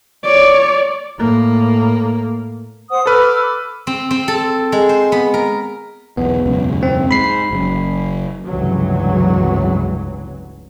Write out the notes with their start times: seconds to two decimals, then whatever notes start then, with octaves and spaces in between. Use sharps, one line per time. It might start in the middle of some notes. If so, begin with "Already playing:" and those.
0.25 C#5 D5
1.17 A2 A#3
2.90 C5 F#5 D#6
3.06 A4 B4 D6 E6 F6
3.87 C4
4.11 C4
4.28 A4
4.72 G#3
4.89 C5
5.12 B3
5.34 A#4
6.17 B1 E2 B3
6.46 E1 C#2 F#2
6.83 C4
7.11 G#2 B5 C7
7.51 F#1 F#2
8.45 F1 C#2 G2 C#3 E3 F#3